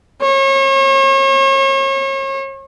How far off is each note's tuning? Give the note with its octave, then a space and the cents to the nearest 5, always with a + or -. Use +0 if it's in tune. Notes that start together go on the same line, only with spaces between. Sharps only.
C#5 -40